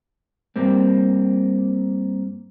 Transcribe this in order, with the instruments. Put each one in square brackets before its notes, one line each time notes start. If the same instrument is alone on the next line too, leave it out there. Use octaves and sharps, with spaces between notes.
[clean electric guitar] G2 G3 A#3 C4